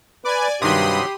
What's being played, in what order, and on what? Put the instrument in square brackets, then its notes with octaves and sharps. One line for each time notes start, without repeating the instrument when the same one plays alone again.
[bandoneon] B4 [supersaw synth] D5 G#5
[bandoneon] G2 [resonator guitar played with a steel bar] C3 D#3 F#3 [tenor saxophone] G4 [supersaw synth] B5 C6 D#6